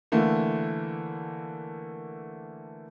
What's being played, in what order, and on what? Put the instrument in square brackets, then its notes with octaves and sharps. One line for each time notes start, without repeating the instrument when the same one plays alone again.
[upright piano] D3 E3 A3 A#3